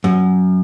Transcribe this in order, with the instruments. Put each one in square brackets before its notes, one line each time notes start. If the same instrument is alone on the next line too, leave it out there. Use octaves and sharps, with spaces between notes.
[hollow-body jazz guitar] F#2